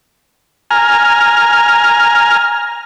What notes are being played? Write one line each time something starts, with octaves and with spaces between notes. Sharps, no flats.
G#5 A#5 F6